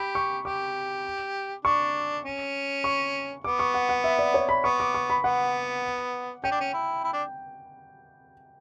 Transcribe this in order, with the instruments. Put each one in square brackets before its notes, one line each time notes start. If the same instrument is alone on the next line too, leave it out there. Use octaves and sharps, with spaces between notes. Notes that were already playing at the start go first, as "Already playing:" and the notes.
Already playing: [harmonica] G4 [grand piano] B5
[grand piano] C#6
[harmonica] G4 [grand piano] D6
[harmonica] D4 [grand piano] C#6
[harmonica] C#4
[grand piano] C#6
[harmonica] B3 [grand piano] D6
[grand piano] C#6
F#5
F#5
E5
D5
C#5
B5
[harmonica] B3 [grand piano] C#6
[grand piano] D6
C#6
B5
[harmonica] B3 [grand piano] F#5
[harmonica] C#4 [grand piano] G5
[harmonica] D4
C#4
E4
E4
D4